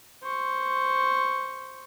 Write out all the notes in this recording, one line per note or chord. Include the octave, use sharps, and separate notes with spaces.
C5 C#6